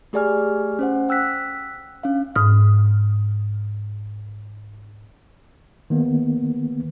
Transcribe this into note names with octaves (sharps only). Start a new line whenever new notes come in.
A3 G4 G#4 D5 G#5 F6
C#4 C5 F#5
G5 E6 F#6 B6
C#4 D4 F5
G#2 D#6 F6
D#3 A#3 B3